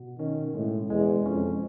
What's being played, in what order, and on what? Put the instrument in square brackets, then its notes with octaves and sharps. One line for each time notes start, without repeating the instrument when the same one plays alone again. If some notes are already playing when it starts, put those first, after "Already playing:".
Already playing: [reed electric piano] B2 F#4
[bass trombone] D#3 [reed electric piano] C#4
[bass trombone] A2 [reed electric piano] G#3
[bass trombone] E2 [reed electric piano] G#3
[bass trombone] F2 [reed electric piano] C#4